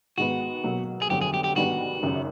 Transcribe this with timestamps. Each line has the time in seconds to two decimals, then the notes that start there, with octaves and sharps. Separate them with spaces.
0.18 G#2 D#3 G#3 B3 F#4
0.64 B2 F#3 A#3
1.02 G#4
1.09 G1 F2 D3 F#3 G4
1.21 G#4
1.34 G4
1.44 G4
1.56 G#2 D#3 G3 B3 D4 F#4
2.03 G#1 F#2 C#3